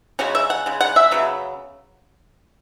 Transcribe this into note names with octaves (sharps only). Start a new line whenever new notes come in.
C#3 G#3 C#4 F#4
E5
F#5
C#3 G#3
F#5
E5
C#3 F#3 B3